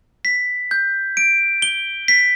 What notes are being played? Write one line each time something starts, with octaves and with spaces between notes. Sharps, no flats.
B6
G6
D7
G7
B6